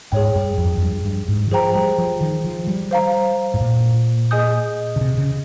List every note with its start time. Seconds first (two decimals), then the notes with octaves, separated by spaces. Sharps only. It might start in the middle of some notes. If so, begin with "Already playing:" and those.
0.12 G#2 G#4 C#5 G5
0.36 G2
0.58 F2
0.78 F2
0.82 G2
1.05 G2
1.28 G#2
1.47 D#3
1.51 F3 G#4 C5 G5 A#5
1.75 G3
1.98 F3
2.21 D#3
2.44 F3
2.67 G3
2.91 C5 F5 A#5
3.54 G#2
3.60 A#2
4.31 G#4 D#5 G#5 D#6 G6
4.96 C#3
5.01 C3
5.17 C#3